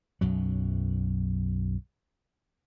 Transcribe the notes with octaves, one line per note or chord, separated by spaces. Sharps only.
B1 F#2 F#3